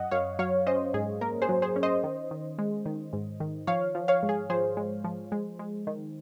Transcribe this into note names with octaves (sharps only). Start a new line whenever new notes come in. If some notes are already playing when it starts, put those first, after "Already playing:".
Already playing: F#2 D#5 F#5
F#2 C#5 F5
F#3 C#5 F5
C#4 C5 D#5
G#2 G#4
A#3 A#4
G#4 C5
F#3
G#4 C5
C#4
C5 D#5
D#3
D#3
G#3
D#3
G#2
D#3
F3 C#5 F5
F3
C#5 F5
G#2
G#4
F3 G#4 C5
G#3
F3
G#3
G#3
D#3